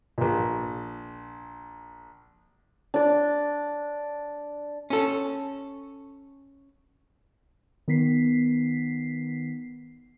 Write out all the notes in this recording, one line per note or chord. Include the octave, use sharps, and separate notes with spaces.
A#1 A#2
D4 D5
C#4 A4
D#3 B3 B6 C7